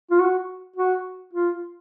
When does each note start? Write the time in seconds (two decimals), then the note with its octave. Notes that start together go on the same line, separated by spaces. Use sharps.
0.11 F4
0.20 F#4
0.76 F#4
1.33 F4